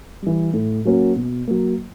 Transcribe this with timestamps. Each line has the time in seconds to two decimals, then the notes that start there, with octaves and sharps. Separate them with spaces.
0.22 E3 G3
0.54 A2
0.85 F#3 A#3 C#4 F#4
1.16 B2
1.47 F#3 A#3